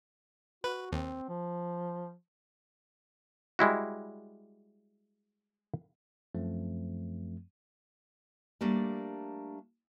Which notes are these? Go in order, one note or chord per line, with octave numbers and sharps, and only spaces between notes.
F#4 B4
D#2 C4
F3
G3 G#3 E4 F#4
F#2 F3 A3 C4
G3 A3 A#3 D4